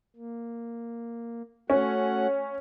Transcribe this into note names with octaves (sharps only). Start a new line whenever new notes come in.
A#3
A3 C#4 F#4 F#5